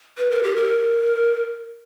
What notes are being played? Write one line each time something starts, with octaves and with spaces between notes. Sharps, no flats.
B4
A#4
G4
A#4